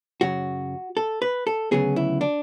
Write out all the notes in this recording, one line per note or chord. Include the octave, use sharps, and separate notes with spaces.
F#2 C#3 F#3 F#4
A4
B4
A4
D2 C#3 F#3 B3 G#4
E4
D4